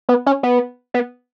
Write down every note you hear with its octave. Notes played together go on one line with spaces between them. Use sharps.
B3
C#4
B3
B3